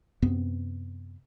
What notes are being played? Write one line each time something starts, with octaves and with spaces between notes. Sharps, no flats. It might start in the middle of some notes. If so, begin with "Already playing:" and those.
F#2 C3 B3 C4